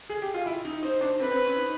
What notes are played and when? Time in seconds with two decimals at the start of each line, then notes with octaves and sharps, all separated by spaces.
0.10 G#4
0.22 G4
0.34 F4
0.46 E4
0.65 D#4
0.83 D#4 C5
1.01 D4
1.20 C4 B4
1.31 C4
1.45 C#4
1.57 D#4